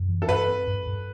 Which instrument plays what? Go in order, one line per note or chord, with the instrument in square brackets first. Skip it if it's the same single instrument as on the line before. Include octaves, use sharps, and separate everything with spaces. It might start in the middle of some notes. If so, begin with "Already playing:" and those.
Already playing: [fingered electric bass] F#2
E3
[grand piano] A4
[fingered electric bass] G2 [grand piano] B4
[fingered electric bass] C4
G2
G2